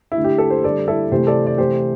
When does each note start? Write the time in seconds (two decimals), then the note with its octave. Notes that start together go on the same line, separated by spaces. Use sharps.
0.12 E4
0.17 D3 A3
0.24 G4
0.38 A4
0.50 C5
0.64 D3 G3 A4 D5
0.88 E4 A4
1.11 C3 E3 A3 G4 C5
1.27 A4 D5
1.47 D5
1.58 C3 E3 A3 G4 C5